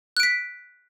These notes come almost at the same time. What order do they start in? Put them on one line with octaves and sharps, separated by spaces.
F#6 D7 B6